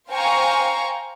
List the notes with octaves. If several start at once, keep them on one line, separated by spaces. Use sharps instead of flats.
C5 F5 G5 G#5 A#5 C#6